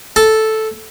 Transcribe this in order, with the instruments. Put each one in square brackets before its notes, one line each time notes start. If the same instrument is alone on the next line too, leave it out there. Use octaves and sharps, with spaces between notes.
[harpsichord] A4